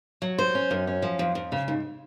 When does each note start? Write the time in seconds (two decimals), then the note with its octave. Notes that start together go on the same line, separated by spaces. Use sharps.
0.22 F#3
0.39 C5
0.55 C#4
0.71 F#2
0.87 C#4
1.02 F3
1.19 F2
1.35 F2
1.52 C#3
1.68 G#2